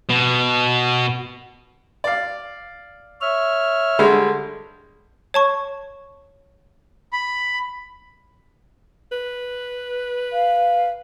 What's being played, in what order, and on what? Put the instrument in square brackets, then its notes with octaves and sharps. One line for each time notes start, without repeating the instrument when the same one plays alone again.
[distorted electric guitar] B2
[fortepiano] D5 F5
[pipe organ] C#5 E5 F6
[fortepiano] D3 G3 G#3
[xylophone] C#5 A5 C#6
[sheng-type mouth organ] B5
[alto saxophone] B4
[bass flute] F5